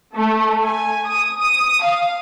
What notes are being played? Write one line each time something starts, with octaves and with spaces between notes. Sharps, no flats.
A3
G#5
D#6
D#6
F5